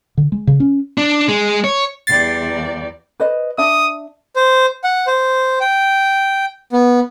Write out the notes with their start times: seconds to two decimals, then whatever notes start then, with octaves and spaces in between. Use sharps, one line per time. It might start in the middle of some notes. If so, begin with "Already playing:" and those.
0.18 D3
0.32 G#3
0.47 C#3
0.60 C#4
0.98 D4
1.29 G#3
1.64 C#5
2.07 E2 G3 D5 A6 C7
3.20 B4 C5 D#5
3.58 D4 E5 D#6
4.36 C5
4.84 F#5
5.07 C5
5.61 G5
6.73 B3